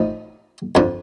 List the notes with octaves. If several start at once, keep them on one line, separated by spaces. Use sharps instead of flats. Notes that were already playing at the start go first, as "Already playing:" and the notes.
Already playing: A2 F3 D#4
F2 D3 F3